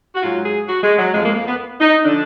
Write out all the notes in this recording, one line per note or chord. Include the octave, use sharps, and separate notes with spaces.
F#4
G#2 F#3 F4
G#4
F#4
G#3
F#3
F2 F3 G#3
A#3
A#3
B3
D#4
D3 F3 D4